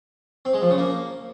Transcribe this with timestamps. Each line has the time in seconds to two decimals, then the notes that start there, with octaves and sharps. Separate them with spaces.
0.45 C4
0.54 G#3
0.62 F3
0.70 C#3
0.78 A#3